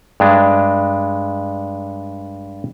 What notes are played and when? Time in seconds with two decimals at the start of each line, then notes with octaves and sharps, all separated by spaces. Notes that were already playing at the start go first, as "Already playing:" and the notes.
0.20 G2 G#3 D4